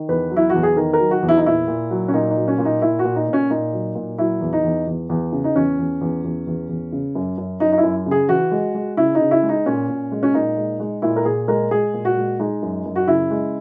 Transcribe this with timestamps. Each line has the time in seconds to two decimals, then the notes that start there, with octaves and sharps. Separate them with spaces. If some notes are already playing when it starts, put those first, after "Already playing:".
Already playing: D#3
0.09 E2 B4
0.31 F#3
0.36 E4
0.49 E2 F#4
0.63 G#4
0.76 D#3 A#4
0.93 A#4
1.00 F#3
1.11 F#4
1.23 E2
1.29 E4
1.37 D#4
1.45 A#2 E4
1.68 A#2
1.91 F#3
2.08 C#4
2.14 A#2 D#4
2.30 D#4
2.37 F#3
2.48 C#4
2.58 A#2
2.65 D#4
2.82 A#2 E4
2.99 F#4
3.04 A#2
3.16 D#4
3.28 A#2 C#4
3.50 A#2 D#4
3.73 F#3
3.95 A#2
4.18 F#3 E4
4.41 E2
4.53 D#4
4.64 E2
4.87 E2
5.09 E2
5.32 C#3
5.44 D#4
5.56 E2 C#4
5.78 E2
6.01 E2
6.24 E2
6.47 E2
6.69 E2
6.92 C#3
7.15 F#2
7.38 F#2
7.60 F#2 D#4
7.72 D#4
7.78 E4
7.83 F#2
8.06 C#3 G#4
8.29 E3 F#4
8.52 G#3
8.75 G#3
8.97 C#3 E4
9.15 D#4
9.20 C#3
9.31 E4
9.43 G#3
9.49 D#4
9.66 A#2 C#4
9.88 A#2
10.12 G#3
10.23 C#4
10.34 A#2 D#4
10.57 G#3
10.80 G#3
11.02 A#2 E4
11.16 A#4
11.25 A#2 G#4
11.48 G#3 A#4
11.71 G#3 G#4
11.94 A#2
12.05 F#4
12.17 G#3
12.39 G#3 D#4
12.62 F#2
12.85 F#2
12.96 F#4
13.07 C#3 E4
13.31 G#3